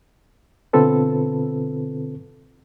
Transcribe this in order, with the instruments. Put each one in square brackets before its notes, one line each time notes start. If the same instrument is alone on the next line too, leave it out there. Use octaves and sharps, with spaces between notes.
[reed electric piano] B2 D3 C4 F4 A4 B4